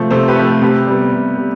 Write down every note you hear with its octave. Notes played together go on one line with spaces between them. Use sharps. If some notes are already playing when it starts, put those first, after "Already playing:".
Already playing: C3 F3 A3
C3 A4 C5
G4 B4
F3 A3
F4 A4
C3 G4 B4
G3 B3
C3
G3